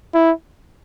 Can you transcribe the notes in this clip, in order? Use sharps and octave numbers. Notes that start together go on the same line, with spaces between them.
E4